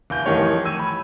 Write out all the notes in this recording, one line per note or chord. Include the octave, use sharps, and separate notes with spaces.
D1 G6
F2 D#3 E3 G3 A3 C#5
E6 G#6 D#7
B5